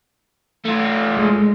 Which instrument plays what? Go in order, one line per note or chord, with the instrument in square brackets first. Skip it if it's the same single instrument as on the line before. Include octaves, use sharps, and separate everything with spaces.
[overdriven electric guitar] A3 F4
[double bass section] G#3